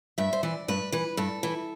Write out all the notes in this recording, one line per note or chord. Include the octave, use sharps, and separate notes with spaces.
G2 E5
C5
E3 D5
G2 B4
E3 B4
G2 A4
E3